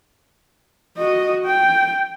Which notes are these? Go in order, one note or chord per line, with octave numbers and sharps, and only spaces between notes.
F#4 D#5
G5